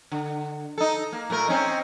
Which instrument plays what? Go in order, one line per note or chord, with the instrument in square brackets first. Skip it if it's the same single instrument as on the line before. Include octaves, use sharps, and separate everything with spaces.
[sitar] D3
D#4 A4
A#3
A#2 A3 A#4
C4 C#4 D#4